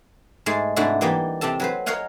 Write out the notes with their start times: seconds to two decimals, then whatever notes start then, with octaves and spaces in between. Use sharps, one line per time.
0.46 G#2 G#3 A3 G#4
0.76 G#2 C3 A3 D4 E4 F#4
1.01 E3 G3 A#3 G4 D#5
1.41 C3 C4 G4 A4 A5
1.60 F#3 B4 C5
1.86 A#4 C#5 D#5 F5 F#5 G#5